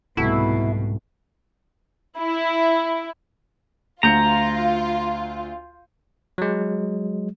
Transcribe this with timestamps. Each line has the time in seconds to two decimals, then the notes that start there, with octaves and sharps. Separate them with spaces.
0.17 C2 G#2 B2 A3 E4 F#4
2.17 E4
4.03 D2 F4 A#5 G6 C#7
6.38 F#3 G#3